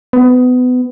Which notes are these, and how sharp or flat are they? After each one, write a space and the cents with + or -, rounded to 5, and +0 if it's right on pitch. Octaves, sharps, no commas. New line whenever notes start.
B3 +25